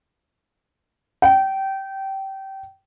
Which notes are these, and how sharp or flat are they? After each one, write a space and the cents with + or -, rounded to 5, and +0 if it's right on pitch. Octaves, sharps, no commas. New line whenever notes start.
G5 -20